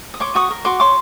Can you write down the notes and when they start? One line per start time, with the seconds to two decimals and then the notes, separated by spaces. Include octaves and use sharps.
0.14 D#6
0.20 C#5 C6 D6
0.35 F#4 C#6 D#6
0.51 A#4
0.65 F#4 C6 D6
0.80 C#5 C6 D6